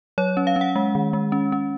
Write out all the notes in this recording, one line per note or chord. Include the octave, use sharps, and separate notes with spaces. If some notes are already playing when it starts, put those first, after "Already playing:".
F#3 C#5
C#4
F5
C#4
F#5
G#3
D#3
G#3
C#4
C#4